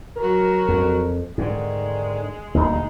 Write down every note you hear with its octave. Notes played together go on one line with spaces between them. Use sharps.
F#3 F#4 A#4
F2
G#2 D3 D#3 G#3
D#1 D2 D#4